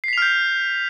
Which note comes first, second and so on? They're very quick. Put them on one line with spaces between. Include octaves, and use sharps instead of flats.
C7 B6 F7 F6 G6